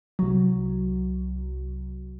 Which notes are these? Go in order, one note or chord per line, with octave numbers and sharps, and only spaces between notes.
C2 F#3